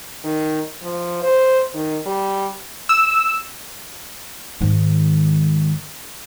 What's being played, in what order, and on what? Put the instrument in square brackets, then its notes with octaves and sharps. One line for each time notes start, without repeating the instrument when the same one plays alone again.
[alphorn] D#3
F3
C5
D#3
G3
[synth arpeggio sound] E6
[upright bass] G#2 D#3